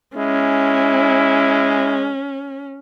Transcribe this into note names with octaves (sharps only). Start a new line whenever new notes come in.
G#3 C#4 E4